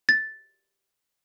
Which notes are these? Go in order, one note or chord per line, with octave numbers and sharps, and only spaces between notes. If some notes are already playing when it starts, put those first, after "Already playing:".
A6